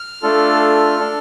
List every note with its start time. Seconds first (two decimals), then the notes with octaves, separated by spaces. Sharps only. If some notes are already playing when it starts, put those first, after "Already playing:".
Already playing: F6
0.23 A3 D4 F4 A4
1.00 D4 A4